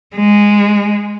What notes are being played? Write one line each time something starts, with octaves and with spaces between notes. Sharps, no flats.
G#3